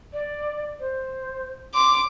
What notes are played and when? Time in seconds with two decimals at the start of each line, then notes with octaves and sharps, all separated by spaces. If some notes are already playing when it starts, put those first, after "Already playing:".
0.13 D5
0.80 C5
1.75 C6 D6